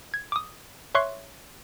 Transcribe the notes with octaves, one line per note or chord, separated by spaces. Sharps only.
G#6
D6 D#6
C#5 E5 C6 C#6 F#6 C7